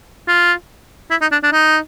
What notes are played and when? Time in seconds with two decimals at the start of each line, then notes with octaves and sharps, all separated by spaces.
0.28 F4
1.10 E4
1.21 D#4
1.31 D4
1.43 D4
1.52 D#4